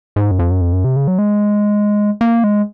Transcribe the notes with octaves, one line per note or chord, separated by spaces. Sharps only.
G#2
F#2
F2
F#2
F2
F#2
C3
C#3
F#3
G#3
A#3
G#3